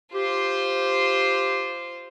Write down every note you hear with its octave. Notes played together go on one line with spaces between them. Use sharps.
F4 G4 C5